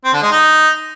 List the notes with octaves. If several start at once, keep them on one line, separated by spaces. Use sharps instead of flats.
C4
D3
G#3
D#4